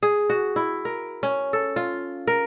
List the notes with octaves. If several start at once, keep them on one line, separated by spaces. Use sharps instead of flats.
G#4
F#4
E4
A#4
C#4
A4
F4
A#4